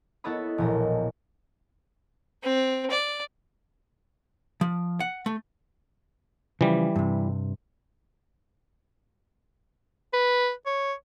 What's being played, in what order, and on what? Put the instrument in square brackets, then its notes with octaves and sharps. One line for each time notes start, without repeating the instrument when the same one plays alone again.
[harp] B3 E4 A4 C#5 D#5 B5
E1 A#1 A#2 D#5
[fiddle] C4
D5
[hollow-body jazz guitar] F3
F#5
A3
[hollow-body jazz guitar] C#3 F3 [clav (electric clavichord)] E3 G3
[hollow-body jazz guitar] G2 C3
[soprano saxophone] B4
C#5